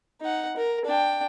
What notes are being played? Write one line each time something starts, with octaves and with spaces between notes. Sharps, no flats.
D#4 F#5
A#4
D4 G5